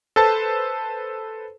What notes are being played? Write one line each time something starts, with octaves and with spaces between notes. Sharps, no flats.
A4 B4 C5 A5